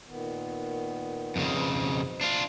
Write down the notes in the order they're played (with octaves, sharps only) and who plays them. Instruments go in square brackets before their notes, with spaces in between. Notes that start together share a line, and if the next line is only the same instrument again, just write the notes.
[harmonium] A#2 D#3 B3
[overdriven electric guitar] F2 C#3
[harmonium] F4 B4 C5
G#2 B2
[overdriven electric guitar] D4 F4